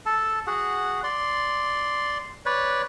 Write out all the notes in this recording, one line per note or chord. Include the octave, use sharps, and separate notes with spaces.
A4 A5
F#4 G#4 F#5
D5 C6
B4 C#5 D5